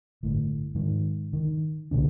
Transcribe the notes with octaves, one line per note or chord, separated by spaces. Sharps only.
G1 A2
G#2 D#3
D#3
C2 A#2 D3 D4